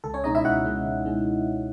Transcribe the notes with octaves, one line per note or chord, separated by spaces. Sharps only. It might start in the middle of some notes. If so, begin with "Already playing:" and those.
C#2 A4
C#4 C#5
B2 G#3 C#4 D#4 D#5
E4 E5
C#2 F#4 F#5
B2 G#3 C#4
C#2
B2 G#3 C#4